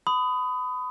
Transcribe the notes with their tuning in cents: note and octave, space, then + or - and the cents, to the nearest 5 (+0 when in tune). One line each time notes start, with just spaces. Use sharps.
B5 +30 D#6 +0